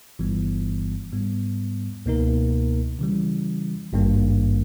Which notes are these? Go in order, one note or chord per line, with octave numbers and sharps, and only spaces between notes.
G1 G2 E3 G3 B3
G#2 G3 B3
C#2 B2 A#3 D#4 A#4
C#3 E3 G3
G#1 G2 D#3 A#3